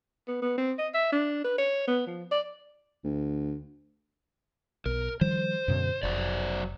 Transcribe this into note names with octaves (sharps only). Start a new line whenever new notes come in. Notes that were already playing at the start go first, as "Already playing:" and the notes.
B3
B3
C4
D#5
E5
D4
B4
C#5
B3
F3
D5
D2
B1 A#4
D#3 F3 G3 C5
F#2 B2 D3
F1 F#3 C5 D5